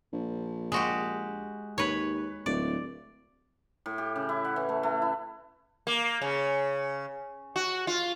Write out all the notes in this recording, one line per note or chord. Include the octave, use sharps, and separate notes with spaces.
A#1
G#3 F#4 G4
D#2 B4 C#5
D1 D5
A2
G4
C#3
E4
F#5
E3
A3
A3
E4
A#3
C#3
F#4
F4